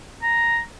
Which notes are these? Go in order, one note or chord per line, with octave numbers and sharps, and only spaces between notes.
A#5